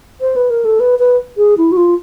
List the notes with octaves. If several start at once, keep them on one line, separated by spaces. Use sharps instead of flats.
C5
B4
A#4
A4
B4
B4
G#4
E4
F#4
F4